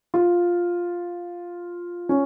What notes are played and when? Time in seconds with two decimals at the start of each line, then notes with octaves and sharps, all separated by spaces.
0.14 F4
2.09 C#4